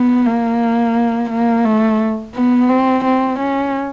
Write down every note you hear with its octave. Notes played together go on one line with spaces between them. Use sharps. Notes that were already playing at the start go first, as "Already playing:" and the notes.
Already playing: B3
A#3
A#3
A3
B3
C4
C4
C#4